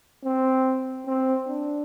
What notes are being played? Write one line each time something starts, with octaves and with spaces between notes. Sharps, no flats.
C4
C4
D4